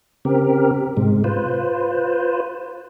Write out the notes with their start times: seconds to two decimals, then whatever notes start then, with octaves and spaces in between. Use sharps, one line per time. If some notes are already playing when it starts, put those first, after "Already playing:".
0.25 C#3 C4 G4 A#4
0.97 G#2 C3 G#3
1.24 F4 B4 C5